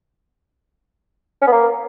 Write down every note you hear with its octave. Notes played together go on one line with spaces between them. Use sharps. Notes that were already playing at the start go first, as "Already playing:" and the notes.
C#4
B3
A#3